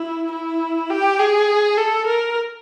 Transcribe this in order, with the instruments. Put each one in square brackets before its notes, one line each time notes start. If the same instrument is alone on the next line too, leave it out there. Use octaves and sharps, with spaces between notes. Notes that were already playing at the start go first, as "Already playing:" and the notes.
Already playing: [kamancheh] E4
E4
G4
G#4
A4
A#4